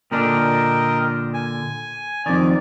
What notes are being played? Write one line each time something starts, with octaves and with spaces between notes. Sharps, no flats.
A#2 D3 D4 A#4 D#5 G5
G#5
F2 D#3 D5